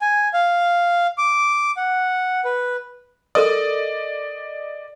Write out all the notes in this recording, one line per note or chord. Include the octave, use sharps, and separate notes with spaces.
G#5
F5
D6
F#5
B4
A4 A#4 D5 D#5 D#6